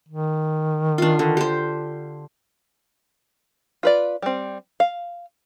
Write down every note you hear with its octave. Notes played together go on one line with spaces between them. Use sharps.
D#3
D4 F4
D3
G4 C5
F4 B4 D5
G3 C4
F5